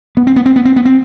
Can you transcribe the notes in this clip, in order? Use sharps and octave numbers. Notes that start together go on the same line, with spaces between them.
B3
C4
B3
C4
B3
C4
B3
C4